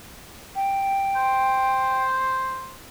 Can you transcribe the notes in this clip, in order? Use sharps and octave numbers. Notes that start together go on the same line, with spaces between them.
G5
C5